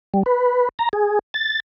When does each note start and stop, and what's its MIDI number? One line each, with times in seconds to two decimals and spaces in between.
0.14 0.23 55
0.26 0.69 71
0.79 0.89 82
0.93 1.19 68
1.34 1.60 93